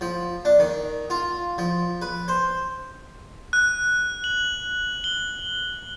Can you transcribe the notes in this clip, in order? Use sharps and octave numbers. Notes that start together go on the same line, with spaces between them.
F3
D4
D#3
F4
F3
B4
C5
F#6
F#7
G7